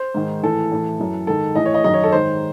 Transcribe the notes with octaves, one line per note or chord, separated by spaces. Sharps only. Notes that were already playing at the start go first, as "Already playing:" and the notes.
Already playing: C5
G#2 D#3
A2 E3 A4
A2 E3
F#2 E3
G#2 D#3 A4
A2 E3 D#5
C#5
D#5
F#2 D#3 D#5
C#5
A4
G#2 D#3 C5